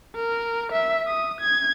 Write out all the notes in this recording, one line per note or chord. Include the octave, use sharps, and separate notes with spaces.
A#4
E5
D#6
G#6